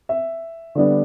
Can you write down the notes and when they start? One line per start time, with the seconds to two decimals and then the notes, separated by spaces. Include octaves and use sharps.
0.09 E5
0.75 D3 G3 B3 D4